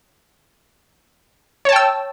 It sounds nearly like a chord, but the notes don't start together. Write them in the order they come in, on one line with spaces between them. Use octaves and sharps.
C#5 A5 G5 E6